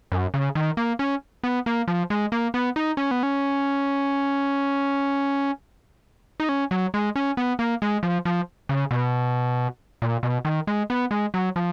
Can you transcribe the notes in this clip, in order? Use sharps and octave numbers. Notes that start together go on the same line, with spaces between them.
F#2
C#3
D#3
A#3
C#4
B3
A#3
F3
G#3
A#3
B3
D#4
C#4
B3
C#4
D#4
C#4
F#3
G#3
C#4
B3
A#3
G#3
F3
F3
C#3
B2
A#2
B2
D#3
G#3
B3
G#3
F#3
F3